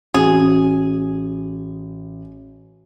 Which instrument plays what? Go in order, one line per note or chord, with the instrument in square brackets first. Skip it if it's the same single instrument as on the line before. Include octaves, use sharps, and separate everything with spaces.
[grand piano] A1 [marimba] F#4 [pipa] G#4